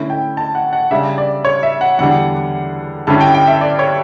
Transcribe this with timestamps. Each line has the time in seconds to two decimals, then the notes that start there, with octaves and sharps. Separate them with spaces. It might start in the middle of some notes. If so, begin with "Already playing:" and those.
Already playing: D3 A3 C#4 E4
0.10 G5
0.37 A5
0.55 F#5
0.73 F#5
0.91 C#3 G3 D4 E5
1.18 D5
1.45 C#5
1.63 E5
1.81 F#5
1.99 E2 D3 G3 D4 F#5
3.07 G2 D3 G3 C#4 E4 A5
3.21 G5
3.35 G5
3.47 E5
3.61 D5
3.79 C#5